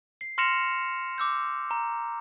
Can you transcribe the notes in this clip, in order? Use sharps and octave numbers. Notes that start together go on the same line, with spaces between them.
C7
C6 F6 A#6 C#7 E7 F7
D6 E6 G6
A#5